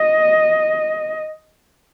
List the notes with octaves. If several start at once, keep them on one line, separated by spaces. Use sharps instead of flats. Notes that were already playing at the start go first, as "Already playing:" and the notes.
Already playing: D#5